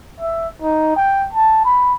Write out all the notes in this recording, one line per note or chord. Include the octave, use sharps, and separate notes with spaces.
E5
D#4
G5
A5
B5